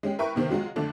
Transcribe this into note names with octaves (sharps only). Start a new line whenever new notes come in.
G#3 C#4 G4
E4 A#4 B4 E5 G5 C#6
G1 C3 D#3 C4 G5
F#3 G#3 F4 F#4
F2 D3 A3 D4